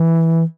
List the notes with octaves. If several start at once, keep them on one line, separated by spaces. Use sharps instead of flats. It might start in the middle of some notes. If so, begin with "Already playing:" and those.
Already playing: E3